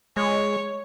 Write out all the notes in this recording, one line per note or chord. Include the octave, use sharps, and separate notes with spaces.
G#3 C#5